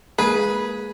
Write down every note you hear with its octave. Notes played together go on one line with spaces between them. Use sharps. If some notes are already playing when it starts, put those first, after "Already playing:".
G#3 A#3 G#4 B4